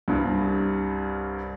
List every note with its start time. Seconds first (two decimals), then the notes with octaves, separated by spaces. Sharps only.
0.08 C2 G2